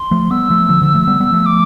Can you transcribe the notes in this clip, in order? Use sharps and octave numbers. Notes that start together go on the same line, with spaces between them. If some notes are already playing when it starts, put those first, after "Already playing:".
Already playing: C6
F3 A3
G3 B3 E6
F3 A3
D3 F3
D3 F3
F3 A3
G3 B3
G3 B3
F3 A3
D6